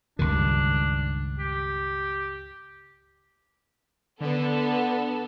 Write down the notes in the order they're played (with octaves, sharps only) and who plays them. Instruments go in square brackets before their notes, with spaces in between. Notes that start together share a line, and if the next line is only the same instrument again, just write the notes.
[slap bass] C#2 G2 D#3 [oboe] D4
[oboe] G4
[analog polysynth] D3 [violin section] B3 A4